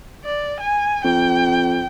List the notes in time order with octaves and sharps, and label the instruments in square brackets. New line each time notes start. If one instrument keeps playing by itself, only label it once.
[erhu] D5
G#5
[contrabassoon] F2 [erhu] G5